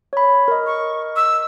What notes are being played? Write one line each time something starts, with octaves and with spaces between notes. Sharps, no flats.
C#5 B5
A#4 D#5
C#6
E6